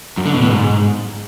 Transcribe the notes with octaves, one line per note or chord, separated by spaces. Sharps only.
F#2
D3
B2
A2
G#2